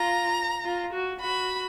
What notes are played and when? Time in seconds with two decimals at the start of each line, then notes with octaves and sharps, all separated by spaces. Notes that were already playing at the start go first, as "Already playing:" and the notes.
Already playing: F4 A#5
0.65 F4
0.93 F#4
1.20 F#4 B5